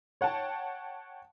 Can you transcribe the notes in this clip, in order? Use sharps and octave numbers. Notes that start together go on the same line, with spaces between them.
C#5 F#5 G5 A5